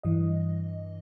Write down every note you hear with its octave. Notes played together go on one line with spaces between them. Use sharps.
G2 E3 D#5